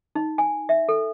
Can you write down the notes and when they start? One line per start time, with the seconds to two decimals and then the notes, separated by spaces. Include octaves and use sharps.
0.15 D#4
0.38 G#5
0.69 E5
0.89 A4